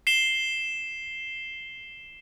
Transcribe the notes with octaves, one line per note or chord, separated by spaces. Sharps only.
C7 E7 G7